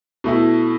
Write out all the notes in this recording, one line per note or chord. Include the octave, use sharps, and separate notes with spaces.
B2 A3 E4